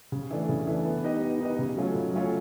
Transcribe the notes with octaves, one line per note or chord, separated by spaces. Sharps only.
C#3
E3 A3 D4
C#3
E3 A3 D4
B3
D#4 G4 B4 D#5
B3
D#4 G4 B4 D#5
C#3
F#3 A3 C#4 F4
C#3
F#3 A3 C#4 F4